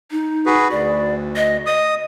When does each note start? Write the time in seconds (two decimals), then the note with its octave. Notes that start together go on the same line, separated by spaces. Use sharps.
0.11 D#4
0.46 F#4 G#4 B4
0.71 D2 D5
1.36 D#5
1.66 D#5 D#6